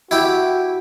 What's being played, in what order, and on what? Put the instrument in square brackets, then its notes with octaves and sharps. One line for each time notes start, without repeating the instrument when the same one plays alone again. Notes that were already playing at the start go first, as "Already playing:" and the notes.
[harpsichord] E4 G4 [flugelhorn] F#4